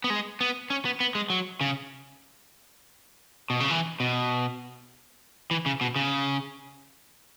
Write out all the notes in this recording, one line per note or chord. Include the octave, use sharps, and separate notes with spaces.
B3
G#3
B3
C#4
B3
B3
G#3
F#3
C#3
B2
C#3
E3
B2
E3
C#3
B2
C#3